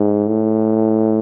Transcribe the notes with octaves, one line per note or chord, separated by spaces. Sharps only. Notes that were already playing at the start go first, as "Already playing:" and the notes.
Already playing: G#2
A2